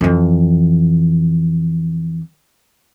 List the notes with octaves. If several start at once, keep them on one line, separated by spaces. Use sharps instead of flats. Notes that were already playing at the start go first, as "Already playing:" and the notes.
F2 E3